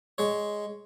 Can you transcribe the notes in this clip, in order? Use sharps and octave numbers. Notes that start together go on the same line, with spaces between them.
G#3 C#5